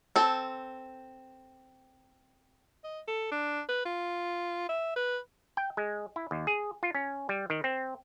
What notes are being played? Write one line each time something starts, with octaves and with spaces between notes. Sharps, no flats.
C4 A4
D#5
A4
D4
B4
F4
E5
B4
G5
G#3
E4
D#2
G#4
F4
C#4
G3
D#3
C4